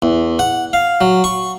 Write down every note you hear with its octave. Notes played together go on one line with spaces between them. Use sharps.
E2
F#5
F5
F#3
C#6